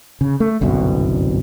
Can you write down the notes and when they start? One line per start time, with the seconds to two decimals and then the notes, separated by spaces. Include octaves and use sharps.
0.21 C#3
0.40 A3
0.61 G1 C2 F#2 B2